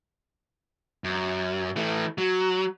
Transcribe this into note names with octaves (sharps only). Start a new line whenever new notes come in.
F#2
E3 A3
F#3